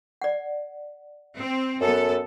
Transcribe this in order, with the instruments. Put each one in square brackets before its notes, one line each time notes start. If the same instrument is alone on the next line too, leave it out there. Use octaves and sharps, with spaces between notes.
[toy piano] D5 F#5
[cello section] C4
[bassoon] F#2 [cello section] B3 A4